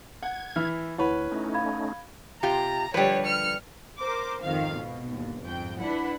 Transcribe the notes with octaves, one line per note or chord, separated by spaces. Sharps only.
F#5 G#6
E3 E4 F6
D2 E4 B4 C#5 F#5
A3 C#4 D#4
F5 B5 G#6
C3 F4 G4 A#5
D3 F3 G3 B4 C#5
F6 C#7
A#4 C5 D6
G#1 F2 D#3 F5
B2
G1 D#2
F2 G#2 G5
D4 E4 B4 F#5